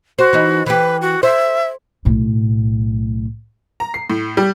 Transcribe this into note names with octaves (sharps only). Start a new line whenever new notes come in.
F#4 C5
E3 D#4
E3 G4 B4
F#4
C5 E5
B1 A2
A#5
C7
A2
G3